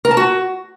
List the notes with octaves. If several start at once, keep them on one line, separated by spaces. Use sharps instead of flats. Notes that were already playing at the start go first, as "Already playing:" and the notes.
A#4
A5
F#4